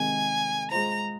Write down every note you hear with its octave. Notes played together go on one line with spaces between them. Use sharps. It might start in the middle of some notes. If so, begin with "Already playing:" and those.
Already playing: C3 D#3 G#3 D#4 G#5
G#3 F4 C5 A#5